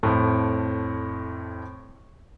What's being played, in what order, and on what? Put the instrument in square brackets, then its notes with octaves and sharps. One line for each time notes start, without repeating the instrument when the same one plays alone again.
[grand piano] F2 A2 A3